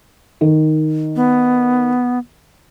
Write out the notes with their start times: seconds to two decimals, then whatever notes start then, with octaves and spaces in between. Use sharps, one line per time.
0.41 D#3
1.16 B3